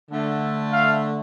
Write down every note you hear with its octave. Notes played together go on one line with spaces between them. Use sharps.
D3 A3
F5